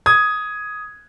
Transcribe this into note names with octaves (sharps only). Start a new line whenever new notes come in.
D#6 G#6